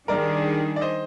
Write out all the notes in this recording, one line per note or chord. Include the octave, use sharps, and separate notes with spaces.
D#3 G3 D4 G#4 A#4 D5
D5
C5 D#5